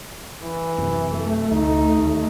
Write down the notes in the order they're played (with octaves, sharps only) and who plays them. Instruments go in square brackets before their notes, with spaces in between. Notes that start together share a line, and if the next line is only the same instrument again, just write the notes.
[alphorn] E3
[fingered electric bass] F#2 C3
[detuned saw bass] A3
[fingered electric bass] D2 [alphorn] D#4
[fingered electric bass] D#2